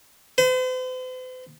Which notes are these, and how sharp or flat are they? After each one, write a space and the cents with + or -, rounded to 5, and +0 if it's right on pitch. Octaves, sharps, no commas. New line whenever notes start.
C5 -45